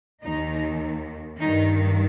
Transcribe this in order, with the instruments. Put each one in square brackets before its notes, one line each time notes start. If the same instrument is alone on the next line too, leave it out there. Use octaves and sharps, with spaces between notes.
[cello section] D#2 D#3 D#4
G2 D#3 D#4